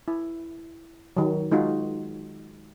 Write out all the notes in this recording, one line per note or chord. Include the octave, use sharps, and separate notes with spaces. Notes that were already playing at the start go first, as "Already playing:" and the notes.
E4
D#3 F#3
G#3 D#4 F4 F#4